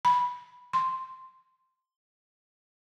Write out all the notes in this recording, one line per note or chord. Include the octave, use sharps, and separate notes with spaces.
B5
C6